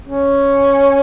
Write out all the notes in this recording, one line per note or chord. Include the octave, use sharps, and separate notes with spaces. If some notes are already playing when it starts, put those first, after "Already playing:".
C#4